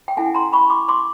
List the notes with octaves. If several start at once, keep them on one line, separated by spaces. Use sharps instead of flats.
G5
C#4 E4 A4 F#5 G#5
A#5 C6
B5 C#6
C6 D6
C6 D6